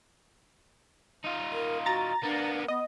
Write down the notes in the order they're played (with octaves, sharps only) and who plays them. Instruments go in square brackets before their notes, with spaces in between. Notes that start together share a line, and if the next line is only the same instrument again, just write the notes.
[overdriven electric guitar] D#4 F4
[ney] A#4
[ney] F#4 [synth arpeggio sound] A#5 A6
[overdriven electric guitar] A#3 B3 [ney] D4
[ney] B3 [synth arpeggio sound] D#5